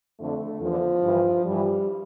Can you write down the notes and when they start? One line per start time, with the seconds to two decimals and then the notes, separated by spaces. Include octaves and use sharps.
0.20 F2 D3 A3
0.62 E2 D3 F3
1.04 G2 E3
1.46 G2 E3 G3